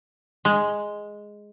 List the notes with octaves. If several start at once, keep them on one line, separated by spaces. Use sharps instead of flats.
G#3